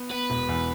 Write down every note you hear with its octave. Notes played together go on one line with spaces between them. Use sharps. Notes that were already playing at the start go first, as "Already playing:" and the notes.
Already playing: B3
B3 B4
E1
E2